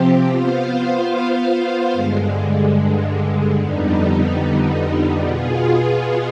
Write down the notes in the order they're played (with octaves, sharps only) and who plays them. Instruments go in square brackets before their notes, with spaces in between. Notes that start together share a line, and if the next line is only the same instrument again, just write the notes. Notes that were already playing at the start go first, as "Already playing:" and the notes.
Already playing: [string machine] C3 F3 C4 G4
B3 F4 C5 F5
G2 D3 G#3
F2 D3 G3 B3 D#4
B2 B3 F4 G#4